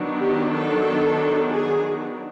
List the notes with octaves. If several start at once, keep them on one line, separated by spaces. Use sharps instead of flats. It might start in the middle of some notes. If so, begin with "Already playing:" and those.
Already playing: D#3 F#3 B3 D4
G4
A4
G#4